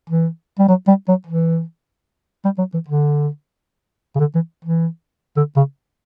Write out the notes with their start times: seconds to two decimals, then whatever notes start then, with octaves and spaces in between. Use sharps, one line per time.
0.10 E3
0.59 G3
0.68 F#3
0.88 G3
1.08 F#3
1.27 E3
2.45 G3
2.58 F#3
2.74 E3
2.88 D3
4.16 C#3
4.20 D3
4.35 E3
4.65 E3
5.37 D3
5.56 C#3